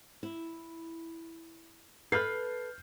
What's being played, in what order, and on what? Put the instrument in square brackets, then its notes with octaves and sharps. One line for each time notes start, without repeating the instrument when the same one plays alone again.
[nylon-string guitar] E4
[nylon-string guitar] A4 B4 [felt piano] F6 G6 C7